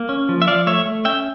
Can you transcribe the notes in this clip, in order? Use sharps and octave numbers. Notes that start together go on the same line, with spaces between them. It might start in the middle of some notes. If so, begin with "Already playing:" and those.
Already playing: A#3
C#4
F3
E5
F3 D5 F5
A3 C#5 E5
A3
C#4 E5 G5